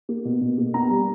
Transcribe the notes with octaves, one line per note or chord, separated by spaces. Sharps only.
A#3
B2
B2
A#3
B3 A#5
G3